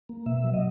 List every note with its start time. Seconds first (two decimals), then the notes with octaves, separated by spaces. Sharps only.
0.09 A#3
0.26 B2 E5
0.44 F#3
0.54 D#5